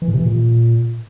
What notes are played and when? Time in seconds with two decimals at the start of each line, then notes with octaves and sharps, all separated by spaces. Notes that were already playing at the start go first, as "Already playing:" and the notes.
0.02 E3
0.08 A2
0.14 C3
0.19 E3
0.25 A#2